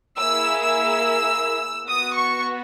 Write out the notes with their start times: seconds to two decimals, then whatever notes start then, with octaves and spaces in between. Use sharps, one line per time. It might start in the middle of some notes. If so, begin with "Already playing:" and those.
0.18 A#3 E4 G#4 E6
0.60 E6
1.87 B3 F#4 D#6
2.16 C#6